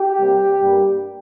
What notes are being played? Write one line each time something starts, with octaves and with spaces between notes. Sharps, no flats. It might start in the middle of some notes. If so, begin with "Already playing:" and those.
Already playing: G4
C3 G3 A#3
G2 G3 A#3